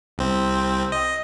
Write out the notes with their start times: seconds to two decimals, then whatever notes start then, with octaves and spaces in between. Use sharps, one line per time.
0.18 C2 C4
0.92 D#5